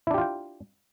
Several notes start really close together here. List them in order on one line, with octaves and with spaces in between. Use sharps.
E4 D4 G4 F4 G5